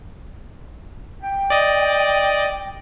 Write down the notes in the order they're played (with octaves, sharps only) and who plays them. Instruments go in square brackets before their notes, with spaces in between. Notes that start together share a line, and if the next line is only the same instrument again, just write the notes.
[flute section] G5
[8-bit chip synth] D5 D#5